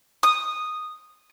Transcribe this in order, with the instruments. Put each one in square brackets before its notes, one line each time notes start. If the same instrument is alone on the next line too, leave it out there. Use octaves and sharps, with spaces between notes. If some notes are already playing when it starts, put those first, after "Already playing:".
[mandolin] D#6